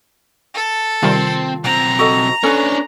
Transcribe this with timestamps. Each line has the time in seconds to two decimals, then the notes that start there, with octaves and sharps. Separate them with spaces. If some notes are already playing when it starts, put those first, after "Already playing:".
0.54 A4
1.03 C3 D#3 G3 C4 F4
1.64 B1 C4 A#5
1.99 F#4 A4 D#5
2.44 C#4 D4 A4 B4 C#5